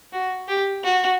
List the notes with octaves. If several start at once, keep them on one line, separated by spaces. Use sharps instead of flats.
F#4
G4
F#4